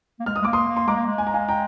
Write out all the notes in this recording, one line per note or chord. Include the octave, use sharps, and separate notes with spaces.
A#3
G#3 F6
D#6
G#3
A#3 D6
C6 D#6
A#3
C6
G#3 A#5 D6
A#3
G#3
G#5
A#5
F5 G#5
G5 A#5